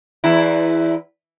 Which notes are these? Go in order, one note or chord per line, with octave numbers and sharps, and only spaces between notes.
E2 E4